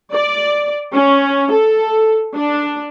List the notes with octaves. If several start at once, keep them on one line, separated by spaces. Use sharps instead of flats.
D5
C#4
A4
D4